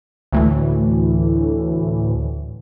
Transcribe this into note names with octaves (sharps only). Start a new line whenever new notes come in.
D2 A2 E3